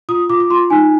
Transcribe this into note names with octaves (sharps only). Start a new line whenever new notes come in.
F4 D#6
F4 D6
D6
F4 C6
D#4 G#5